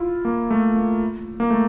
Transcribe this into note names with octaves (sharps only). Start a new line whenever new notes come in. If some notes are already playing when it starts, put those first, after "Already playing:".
Already playing: E4 F4
A#3
A3
A#3
A#3
A3